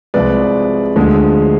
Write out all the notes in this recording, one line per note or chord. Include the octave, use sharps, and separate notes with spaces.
C2 C3 F3 G#3 B4 D5
D2 D3 F3 G#3